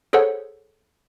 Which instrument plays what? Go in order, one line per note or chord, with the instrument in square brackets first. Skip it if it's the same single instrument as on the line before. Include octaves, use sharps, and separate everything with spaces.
[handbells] G#4 A4 C5 C#5 F#5